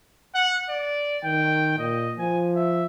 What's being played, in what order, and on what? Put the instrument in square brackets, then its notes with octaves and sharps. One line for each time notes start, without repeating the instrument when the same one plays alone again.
[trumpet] F#5
D5
[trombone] D#3 [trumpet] G5
[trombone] A#2 [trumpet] D#5
[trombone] F3 [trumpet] G#5
[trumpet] E5